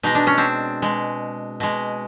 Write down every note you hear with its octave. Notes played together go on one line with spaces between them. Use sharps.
B2 G#3 D#4
D4
C#4
C4 D4
B2 G#3
B2 G#3